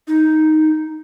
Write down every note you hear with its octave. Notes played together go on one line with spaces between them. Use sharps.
D#4